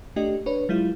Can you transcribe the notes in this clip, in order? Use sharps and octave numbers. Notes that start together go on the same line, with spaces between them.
A3 D4 G4 D#5
D4 B4 C#5
F#3 G#3 E4 F4